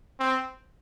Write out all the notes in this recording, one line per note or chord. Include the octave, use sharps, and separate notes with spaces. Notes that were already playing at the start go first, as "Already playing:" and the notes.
C4